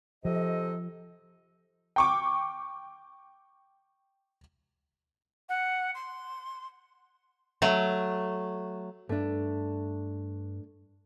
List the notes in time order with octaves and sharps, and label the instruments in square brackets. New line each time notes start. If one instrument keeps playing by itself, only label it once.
[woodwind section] C3 A4 D#5 [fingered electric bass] F3
[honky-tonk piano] G5 C#6 D6
[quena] F#5
C6
[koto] F#3 A3
[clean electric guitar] G2 [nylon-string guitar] A3 D4